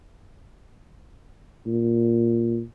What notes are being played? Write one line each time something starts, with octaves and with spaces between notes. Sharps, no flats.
A#2